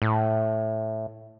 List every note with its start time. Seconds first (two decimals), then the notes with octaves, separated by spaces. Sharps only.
0.02 A2